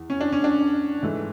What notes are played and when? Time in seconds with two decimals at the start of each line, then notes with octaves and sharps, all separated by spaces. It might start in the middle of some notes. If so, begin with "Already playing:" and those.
Already playing: E2
0.10 C#4
0.21 D4
0.32 C#4
0.44 D4
1.02 G#2 E3 A3